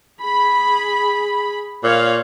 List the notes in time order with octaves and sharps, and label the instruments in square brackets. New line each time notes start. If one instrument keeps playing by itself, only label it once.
[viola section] G#4 B5
[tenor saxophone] A#2 [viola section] C#5 F5